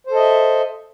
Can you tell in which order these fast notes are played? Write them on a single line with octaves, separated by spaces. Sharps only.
C5 A4 D#5 E5